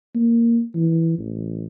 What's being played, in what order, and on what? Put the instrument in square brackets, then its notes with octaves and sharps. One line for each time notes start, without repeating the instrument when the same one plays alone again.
[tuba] A#3
E3
A1